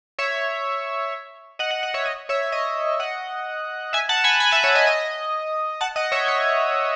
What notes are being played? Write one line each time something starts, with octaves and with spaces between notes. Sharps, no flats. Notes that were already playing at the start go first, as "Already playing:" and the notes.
C#5 E5
D#5 F#5
D#5 F#5
D#5 F#5
C#5 E5
D#5
C#5 E5
D#5
D#5 F#5
E5 G#5
F#5 A5
G#5 B5
G#5 B5
E5 G#5
C#5 E5
D#5
D#5
F#5 A5
D#5 F#5
C#5 E5
C#5